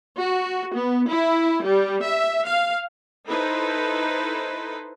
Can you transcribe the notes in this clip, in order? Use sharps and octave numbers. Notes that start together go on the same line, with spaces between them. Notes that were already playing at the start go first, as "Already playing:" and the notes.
F#4
B3
E4
G3
E5
F5
D#4 E4 A4 B4 C5